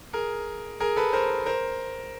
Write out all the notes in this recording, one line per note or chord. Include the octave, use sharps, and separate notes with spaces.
G#4 A#4
G#4 A#4
A4 B4
A#4 C5
A#4 C5